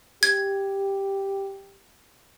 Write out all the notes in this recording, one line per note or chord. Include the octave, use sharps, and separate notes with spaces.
G4 G#6